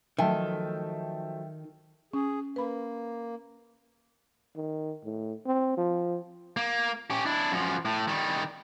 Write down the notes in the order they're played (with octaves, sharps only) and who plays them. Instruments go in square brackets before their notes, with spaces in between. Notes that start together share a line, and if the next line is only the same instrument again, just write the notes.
[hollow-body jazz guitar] D#3 [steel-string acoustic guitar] F3 F#3 A3 [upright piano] E5 G5 A5
[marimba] C#4 [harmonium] G#4
[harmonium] A#3 [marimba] B4 B5
[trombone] D#3
A2
C4
F3
[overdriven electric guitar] A#3
C#4 G4
D4 E4
F#2 F3
A2
D#3 G3